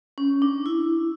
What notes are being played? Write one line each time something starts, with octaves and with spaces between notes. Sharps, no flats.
C#4
D4
E4